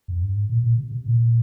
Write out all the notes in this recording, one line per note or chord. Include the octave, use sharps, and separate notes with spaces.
F2
G2
G#2
A#2
A#2
C3
C3
A#2